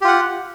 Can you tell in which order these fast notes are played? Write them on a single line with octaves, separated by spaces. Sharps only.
G4 F4 F#5